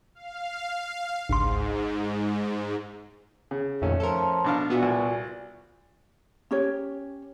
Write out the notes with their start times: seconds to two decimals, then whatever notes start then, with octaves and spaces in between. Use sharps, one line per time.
0.15 F5
1.29 G#1 C#2 G#2 C6
3.51 C#3
3.82 F2 A#2 D#3 A3 C#4
4.00 F3 A4 A#4
4.44 B2 D4 F5
4.70 A#2 B3 F#4 E5
4.83 C2
6.51 C#4 G4 C#5